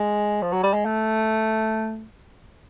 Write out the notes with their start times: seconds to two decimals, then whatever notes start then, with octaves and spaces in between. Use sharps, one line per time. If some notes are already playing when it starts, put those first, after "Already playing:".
Already playing: G#3
0.42 F3
0.52 F#3
0.63 G3
0.74 G#3
0.85 A3